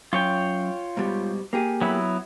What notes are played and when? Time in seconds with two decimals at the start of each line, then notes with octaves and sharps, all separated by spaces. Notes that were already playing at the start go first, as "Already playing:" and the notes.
0.13 F#2 F4 C#5 G5
0.97 G#2 B2 G3
1.53 A#3 G4 G#4
1.81 F#3 B3 E4